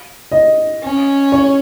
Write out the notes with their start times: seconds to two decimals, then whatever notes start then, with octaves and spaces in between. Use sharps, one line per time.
0.32 D#5
0.82 C#4
1.32 C#5